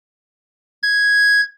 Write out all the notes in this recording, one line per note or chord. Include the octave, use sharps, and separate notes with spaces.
G#6